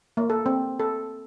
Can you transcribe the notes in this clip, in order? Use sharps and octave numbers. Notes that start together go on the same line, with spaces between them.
A#3
A4
C4
A4